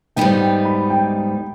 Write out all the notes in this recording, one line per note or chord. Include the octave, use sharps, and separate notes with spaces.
G#2 G3 B3 D#4 G5
G5
B5
G5